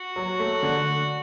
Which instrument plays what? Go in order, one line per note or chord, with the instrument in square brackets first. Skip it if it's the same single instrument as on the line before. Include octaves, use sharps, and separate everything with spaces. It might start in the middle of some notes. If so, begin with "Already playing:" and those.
Already playing: [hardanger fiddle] F#4
[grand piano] F#3
A3
D3